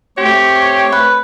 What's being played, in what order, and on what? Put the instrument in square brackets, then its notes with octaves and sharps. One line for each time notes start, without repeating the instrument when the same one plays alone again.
[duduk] A3 [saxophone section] C4 C5 C#5 [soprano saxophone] G4
[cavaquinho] B4